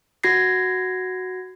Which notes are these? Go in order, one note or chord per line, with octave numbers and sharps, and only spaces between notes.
F#4 G#6 A#6 C7